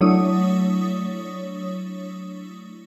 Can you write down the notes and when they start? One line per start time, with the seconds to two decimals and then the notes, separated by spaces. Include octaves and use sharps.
0.01 F#3 A3 D4 E4 C#5 D#6